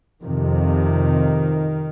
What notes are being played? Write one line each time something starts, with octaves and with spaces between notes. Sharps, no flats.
F2 C3 D#3